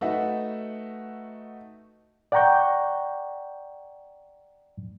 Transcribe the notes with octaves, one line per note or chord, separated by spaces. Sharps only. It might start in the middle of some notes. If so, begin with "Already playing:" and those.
A3 D#4 F#4 B4 E5 F#5
D5 F#5 G5 A#5 C#6 G6